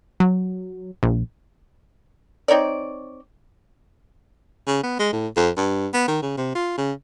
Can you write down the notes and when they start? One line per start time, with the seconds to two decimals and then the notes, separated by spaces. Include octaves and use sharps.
0.20 F#3
1.03 A#1
2.48 C4 D#4 C#5 D5
4.67 C#3
4.83 B3
4.99 G#3
5.13 A2
5.37 F2
5.57 G2
5.94 B3
6.08 D#3
6.22 C#3
6.37 C3
6.55 F4
6.78 C#3